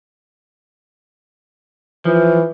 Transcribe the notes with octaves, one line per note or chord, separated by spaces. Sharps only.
E3 F3